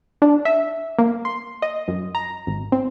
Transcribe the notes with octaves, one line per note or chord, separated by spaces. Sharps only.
D4
E5
A#3
C6
D#5
F#2
A#5
G#1
C4